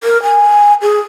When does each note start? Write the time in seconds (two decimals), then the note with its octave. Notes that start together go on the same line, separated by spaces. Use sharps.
0.03 A#4
0.22 G#5
0.81 G#4